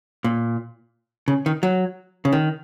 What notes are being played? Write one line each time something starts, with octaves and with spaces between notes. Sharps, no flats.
A#2
C#3
D#3
F#3
C#3
D#3